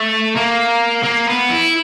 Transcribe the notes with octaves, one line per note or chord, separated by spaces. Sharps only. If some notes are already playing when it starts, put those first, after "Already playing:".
Already playing: A3
A#3
A#3
B3
E4